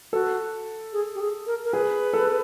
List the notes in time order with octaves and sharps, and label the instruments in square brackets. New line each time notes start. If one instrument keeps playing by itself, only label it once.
[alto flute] F#4 [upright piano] A4
[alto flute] G#4
G4
G#4
A#4
A#4
[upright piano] G#4 [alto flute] B4
[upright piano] A4